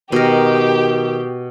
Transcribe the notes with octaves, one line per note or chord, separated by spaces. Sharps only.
B2 D#3 G4 A#4